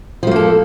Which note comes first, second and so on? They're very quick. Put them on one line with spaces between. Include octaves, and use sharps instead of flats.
F3 A3 A#3 A4